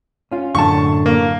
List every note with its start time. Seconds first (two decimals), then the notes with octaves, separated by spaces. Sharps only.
0.32 C#4 F4
0.55 F#2 A2 D3 A5 C#6
1.06 A#3